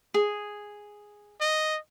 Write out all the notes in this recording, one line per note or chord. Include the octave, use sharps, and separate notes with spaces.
G#4
D#5